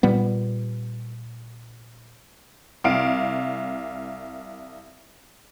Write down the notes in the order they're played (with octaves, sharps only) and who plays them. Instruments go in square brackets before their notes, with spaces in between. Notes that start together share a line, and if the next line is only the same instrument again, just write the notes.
[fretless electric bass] A#2 G3 B3
[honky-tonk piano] C2 F5 D7